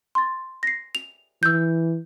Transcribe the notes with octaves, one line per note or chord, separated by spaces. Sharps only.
C6 A6
A#6 C7
F7
E3 E6 G6